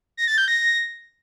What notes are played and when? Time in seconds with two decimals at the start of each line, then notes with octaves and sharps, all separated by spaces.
0.17 A#6
0.28 A6
0.38 G6
0.48 A#6